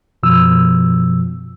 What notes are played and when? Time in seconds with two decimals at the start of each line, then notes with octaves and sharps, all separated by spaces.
0.23 F#2 B2 F3 E6